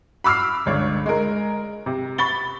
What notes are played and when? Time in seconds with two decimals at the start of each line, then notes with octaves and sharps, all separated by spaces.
0.24 B5 D6 E6 F6 C7
0.66 G1 C#2 C#5 D5
1.06 G#3 A#4
1.86 C3
2.18 B5 C#6 A6 G7